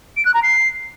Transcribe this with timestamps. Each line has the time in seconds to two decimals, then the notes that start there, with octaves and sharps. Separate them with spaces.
0.17 D7
0.25 F#6
0.34 A#5
0.43 C7